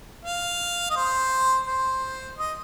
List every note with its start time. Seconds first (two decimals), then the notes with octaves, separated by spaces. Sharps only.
0.25 F5
0.90 D#5
0.96 C5
1.67 C5
2.38 D#5